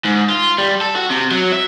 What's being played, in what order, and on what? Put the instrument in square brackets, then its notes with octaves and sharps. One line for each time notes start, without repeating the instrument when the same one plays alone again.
[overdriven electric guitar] G#2
F4
G3
A4
F#4
C3
F#3
E5